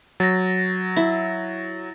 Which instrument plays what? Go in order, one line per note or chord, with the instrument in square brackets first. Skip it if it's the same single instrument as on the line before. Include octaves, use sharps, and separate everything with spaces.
[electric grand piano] F#3 [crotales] A6 A#6
[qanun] E4